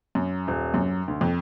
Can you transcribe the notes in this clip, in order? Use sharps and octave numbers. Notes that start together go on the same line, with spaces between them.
F#2
D#1
F#2
D2
F2